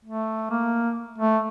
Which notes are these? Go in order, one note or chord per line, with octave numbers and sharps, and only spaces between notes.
A3
A#3
A3